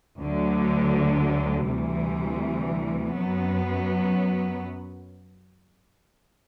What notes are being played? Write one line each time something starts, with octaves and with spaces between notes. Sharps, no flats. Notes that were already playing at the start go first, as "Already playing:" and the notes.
D2 D3 F#3
D2 C3 E3 G3
F#2 F#3 B3